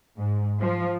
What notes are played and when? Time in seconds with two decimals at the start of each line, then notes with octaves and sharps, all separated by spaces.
0.18 G#2
0.61 F3